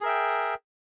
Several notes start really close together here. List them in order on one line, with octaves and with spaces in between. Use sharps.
G#4 A#4 E5 G5